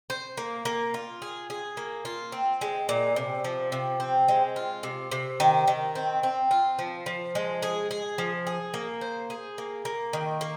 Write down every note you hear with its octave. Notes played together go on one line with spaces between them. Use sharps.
C5
A#3
A#3
F4
G#4
G#4
A#3
F4
C4
G#3
A#2
C3
F3
C3
C4
G#3
F4
C3
C3
D#3
D#3
C4
C4
F4
F3
F3
G#3
G#4
G#4
F3
G#4
A#3
C5
G#4
A#3
A#3
D#3
A#3